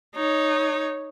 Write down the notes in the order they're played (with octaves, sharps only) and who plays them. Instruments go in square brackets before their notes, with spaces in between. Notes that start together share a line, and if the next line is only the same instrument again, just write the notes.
[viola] D#4 C#5